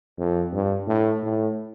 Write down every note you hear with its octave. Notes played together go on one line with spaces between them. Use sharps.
F2
G2
A2
A2